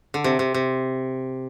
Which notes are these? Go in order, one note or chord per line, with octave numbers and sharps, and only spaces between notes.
D3
C3
C3
C3